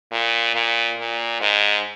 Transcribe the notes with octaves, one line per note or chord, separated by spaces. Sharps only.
A#2
A#2
A#2
G#2